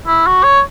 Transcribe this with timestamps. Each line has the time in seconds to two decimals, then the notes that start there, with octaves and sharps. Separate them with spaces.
0.07 E4
0.27 F#4
0.44 C#5